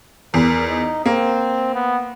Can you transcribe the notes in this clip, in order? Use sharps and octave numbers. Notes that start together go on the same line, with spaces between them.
E2 A#4
D#4
A#3 C4
B3